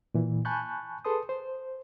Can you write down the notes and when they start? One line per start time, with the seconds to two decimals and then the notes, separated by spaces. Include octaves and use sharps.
0.14 A#2 E3
0.45 G#5 A5 B5 C#6 F#6 G6
1.05 G#4 A4 B4 A5 C6 D#6
1.29 C5